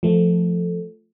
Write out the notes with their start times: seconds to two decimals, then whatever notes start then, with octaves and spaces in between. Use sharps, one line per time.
0.03 F3 A3